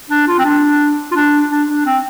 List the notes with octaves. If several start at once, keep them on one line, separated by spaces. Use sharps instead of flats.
D4
F4
C4
D4
F4
D4
D4
D4
C4